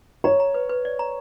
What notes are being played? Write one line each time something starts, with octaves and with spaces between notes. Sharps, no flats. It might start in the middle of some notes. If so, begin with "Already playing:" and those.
C#5 A#5
A#5
B4
B4
D5
A#5